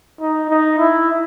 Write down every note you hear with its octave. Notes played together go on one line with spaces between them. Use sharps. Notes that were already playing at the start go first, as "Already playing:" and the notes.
D#4
D#4
E4